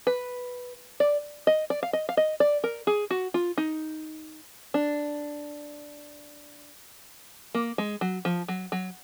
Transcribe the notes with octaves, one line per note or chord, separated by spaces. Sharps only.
B4
D5
D#5
D5
F5
D#5
F5
D#5
D5
A#4
G#4
F#4
F4
D#4
D4
A#3
G#3
F#3
F3
F#3
F#3